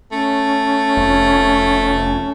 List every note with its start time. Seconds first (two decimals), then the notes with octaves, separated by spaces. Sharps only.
0.12 A3 C#4
0.97 F1